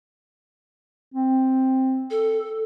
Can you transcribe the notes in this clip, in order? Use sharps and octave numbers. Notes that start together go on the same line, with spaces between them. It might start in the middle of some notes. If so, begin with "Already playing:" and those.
C4
A4